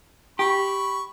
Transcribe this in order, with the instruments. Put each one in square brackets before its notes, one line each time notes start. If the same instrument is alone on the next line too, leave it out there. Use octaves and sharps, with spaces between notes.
[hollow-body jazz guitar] G4 [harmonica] B5 C#6